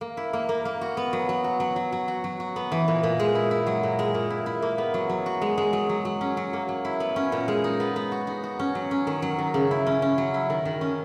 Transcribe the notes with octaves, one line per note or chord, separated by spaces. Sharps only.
A#3
E4
A#3
A#3
A#3
F#4
B3
F#3
F#3
F#4
F#3
F#3
F#3
F#4
F#3
F#4
B3
E3
A#2
A#2
G#3
E4
E4
F#3
A#2
G#3
A#2
E4
E4
A#3
B3
F#3
F#3
F#4
G#3
G#3
F#3
F#3
F#3
C#4
F#3
A#3
F#3
E4
B3
C#4
A#2
G#3
D#4
B3
B3
F#4
D#4
F#4
C#4
F#3
C#4
D#3
F#3
D#3
C#3
E4
C#4
C#4
F#3
E4
D#3
D#3
C#4